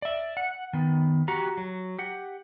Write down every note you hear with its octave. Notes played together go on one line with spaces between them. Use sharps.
D5 E5
F#5
D#3 B3
F#4 G4 A#5
F#3
G4 F#5